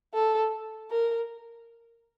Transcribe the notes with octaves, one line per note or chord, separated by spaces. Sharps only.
A4
A#4